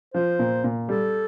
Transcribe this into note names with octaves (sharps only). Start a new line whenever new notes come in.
F3 C5
A#2
A#2
G3 A4